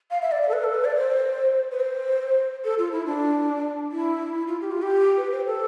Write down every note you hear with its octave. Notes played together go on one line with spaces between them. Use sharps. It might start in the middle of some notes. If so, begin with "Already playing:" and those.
F5
E5
D5
D5
A4
B4
A4
B4
D5
C5
B4
C5
A4
F4
E4
D4
E4
E4
F4
G4
F4
G4
B4
C5
A4